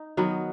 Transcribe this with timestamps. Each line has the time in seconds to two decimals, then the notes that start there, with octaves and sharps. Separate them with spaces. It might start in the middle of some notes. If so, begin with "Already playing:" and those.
Already playing: D#4
0.17 D#3 F#3 B3